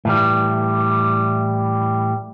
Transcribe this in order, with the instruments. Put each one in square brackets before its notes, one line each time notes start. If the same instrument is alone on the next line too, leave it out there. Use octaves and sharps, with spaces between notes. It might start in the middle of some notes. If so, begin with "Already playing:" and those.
[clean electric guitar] A2 E3 G3